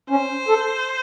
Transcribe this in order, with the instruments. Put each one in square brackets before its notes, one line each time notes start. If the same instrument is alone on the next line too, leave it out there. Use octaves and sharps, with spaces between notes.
[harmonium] C#4 [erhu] C5
[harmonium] A4